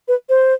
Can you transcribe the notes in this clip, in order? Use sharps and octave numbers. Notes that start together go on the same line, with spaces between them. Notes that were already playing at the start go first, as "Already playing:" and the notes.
B4
C5